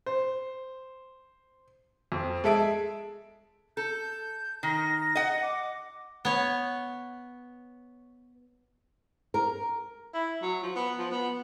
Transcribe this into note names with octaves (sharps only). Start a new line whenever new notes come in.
C5
F2
G#3 A4 E5 D7
A4 G6
D#3 A#6
D#5 F#5
D6
B3 C#5
A#4
E4
F#3
F3
B3
F3
B3